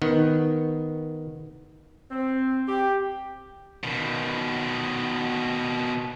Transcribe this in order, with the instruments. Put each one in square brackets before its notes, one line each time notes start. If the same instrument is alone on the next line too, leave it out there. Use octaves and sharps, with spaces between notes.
[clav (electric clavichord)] D#3 B3
[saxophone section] C4
G4
[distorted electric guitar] B2 D#3